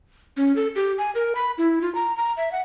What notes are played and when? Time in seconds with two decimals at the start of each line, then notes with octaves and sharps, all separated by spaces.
0.37 C#4
0.56 A4
0.76 G4
0.98 G#5
1.15 A#4
1.35 B5
1.58 E4
1.82 F4
1.95 A#5
2.17 A#5
2.37 E5
2.52 F#5